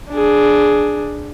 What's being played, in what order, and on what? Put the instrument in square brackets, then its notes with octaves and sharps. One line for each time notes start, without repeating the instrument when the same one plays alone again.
[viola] D4 G#4